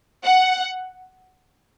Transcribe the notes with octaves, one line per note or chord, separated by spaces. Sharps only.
F#5